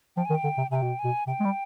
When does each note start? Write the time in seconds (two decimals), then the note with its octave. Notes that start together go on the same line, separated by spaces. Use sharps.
0.17 F3 G5
0.25 G#5
0.30 D#3
0.35 G5
0.44 D3
0.58 C3
0.71 C3 G#5
0.75 G5
0.82 B2
0.99 G#5
1.04 B2
1.27 C3 G5
1.40 G#3
1.45 G3